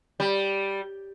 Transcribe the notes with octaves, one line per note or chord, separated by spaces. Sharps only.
G3